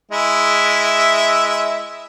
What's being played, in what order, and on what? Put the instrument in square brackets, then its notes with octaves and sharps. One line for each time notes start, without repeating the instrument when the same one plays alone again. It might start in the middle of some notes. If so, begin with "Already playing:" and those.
[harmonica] G#3 E4 E5